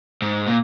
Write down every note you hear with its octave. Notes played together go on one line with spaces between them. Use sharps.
G#2
A#2